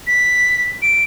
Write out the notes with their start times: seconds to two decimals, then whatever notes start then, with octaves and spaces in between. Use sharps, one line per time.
0.07 B6
0.82 D7